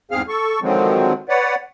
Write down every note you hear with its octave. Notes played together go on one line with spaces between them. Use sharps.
E2 G#2 C4 G#4 F5 F6
A4 C#6
D3 D#3 F3 F#3 G#3 C4
B4 C#5 D5 F#5